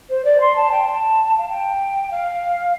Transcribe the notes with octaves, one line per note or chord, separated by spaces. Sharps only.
C5
D5
C6
A5
G5
A5
F5
G5
F5